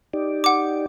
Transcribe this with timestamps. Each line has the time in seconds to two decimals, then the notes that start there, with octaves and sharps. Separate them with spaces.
0.13 D#4 G4 D5
0.44 F#5 D6